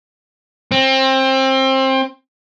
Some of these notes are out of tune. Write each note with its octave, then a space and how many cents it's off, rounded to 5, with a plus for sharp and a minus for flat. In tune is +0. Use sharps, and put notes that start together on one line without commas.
C4 +25